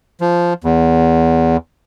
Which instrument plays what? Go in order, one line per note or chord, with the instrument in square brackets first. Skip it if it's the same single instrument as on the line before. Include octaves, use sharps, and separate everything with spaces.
[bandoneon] F3
E2